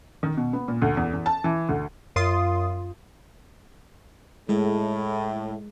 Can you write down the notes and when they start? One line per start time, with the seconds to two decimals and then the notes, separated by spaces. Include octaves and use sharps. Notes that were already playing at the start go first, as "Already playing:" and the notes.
0.23 D#3
0.37 B2
0.53 B3
0.68 A#2
0.82 D2
0.97 E2
1.13 E2
1.26 A5
1.44 E3
1.69 D2
2.16 F#2 F4 F5 C6 D#6
4.49 A2 G#3